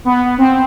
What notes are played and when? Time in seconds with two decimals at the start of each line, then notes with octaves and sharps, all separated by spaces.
0.05 B3
0.38 C4